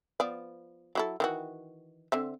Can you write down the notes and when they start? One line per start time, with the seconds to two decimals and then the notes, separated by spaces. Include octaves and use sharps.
0.20 F3 B3 D5
0.95 F#3 E4 A4
1.20 D#3 E3 F#4
2.12 D3 C4 E5